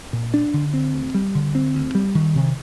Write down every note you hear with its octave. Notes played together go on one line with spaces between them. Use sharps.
A#2
D4
D3
C4
D2
G3
D3
C4
D2
G3
D#3
C3